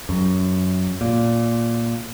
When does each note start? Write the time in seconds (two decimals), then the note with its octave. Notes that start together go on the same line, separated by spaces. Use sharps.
0.09 F#2
1.01 A#2